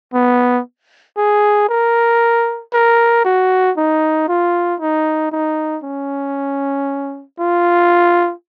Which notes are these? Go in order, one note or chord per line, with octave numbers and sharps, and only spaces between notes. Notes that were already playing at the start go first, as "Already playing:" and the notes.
B3
G#4
A#4
A#4
F#4
D#4
F4
D#4
D#4
C#4
F4